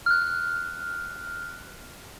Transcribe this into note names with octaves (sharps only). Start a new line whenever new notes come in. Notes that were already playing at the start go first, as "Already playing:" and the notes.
F6 F#6